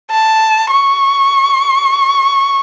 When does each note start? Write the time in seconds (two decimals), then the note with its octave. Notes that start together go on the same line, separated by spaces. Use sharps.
0.10 A5
0.71 C#6